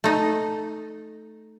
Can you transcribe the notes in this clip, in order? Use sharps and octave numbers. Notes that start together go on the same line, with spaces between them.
A3 D#4